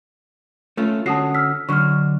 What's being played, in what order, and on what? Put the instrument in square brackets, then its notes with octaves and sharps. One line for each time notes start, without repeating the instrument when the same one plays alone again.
[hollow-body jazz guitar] A3 C#4 F4
[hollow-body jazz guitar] D3 C#4 F#4 [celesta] A5 D#6 C7
[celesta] E6 F6 B6
[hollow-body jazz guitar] D3 F#3 [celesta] C#6 F6